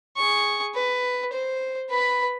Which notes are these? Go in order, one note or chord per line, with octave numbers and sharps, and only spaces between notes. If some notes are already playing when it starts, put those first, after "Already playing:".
G#4 C#6
B4
C5
B4 B5